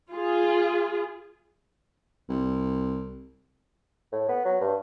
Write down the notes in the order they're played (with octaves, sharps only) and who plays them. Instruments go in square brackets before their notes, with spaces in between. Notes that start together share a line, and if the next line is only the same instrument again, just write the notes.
[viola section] F4 G#4
[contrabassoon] C2
[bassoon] A2
B3
F#3
G2